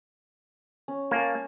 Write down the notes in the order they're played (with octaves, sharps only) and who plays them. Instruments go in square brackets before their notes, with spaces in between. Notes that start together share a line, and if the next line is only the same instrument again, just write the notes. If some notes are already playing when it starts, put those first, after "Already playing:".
[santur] C#4
[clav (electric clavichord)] A#3 [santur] C#5 G#5 A5